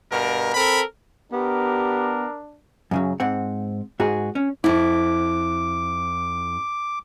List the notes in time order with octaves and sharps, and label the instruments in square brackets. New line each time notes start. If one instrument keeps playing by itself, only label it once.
[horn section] G2 B2 A#4
C4 A4 A#4 B5
[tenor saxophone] B3 [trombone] D4 [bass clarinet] G4 [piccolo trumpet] A#4
[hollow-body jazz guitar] F#2 C#3 F#3
G#2 C4 F#5
G#2 F#4 G#4
C#4
[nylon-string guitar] F2 E4 [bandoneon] D6